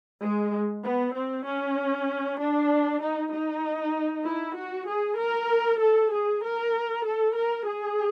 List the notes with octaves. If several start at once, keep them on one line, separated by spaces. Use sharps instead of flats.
G#3
B3
C4
C#4
D4
D#4
D#4
E4
F#4
G#4
A#4
A4
G#4
A#4
A4
A#4
G#4